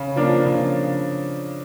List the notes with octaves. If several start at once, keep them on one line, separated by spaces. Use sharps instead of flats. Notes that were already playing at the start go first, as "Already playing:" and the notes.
Already playing: C#3
F3 A#3 D4
C#3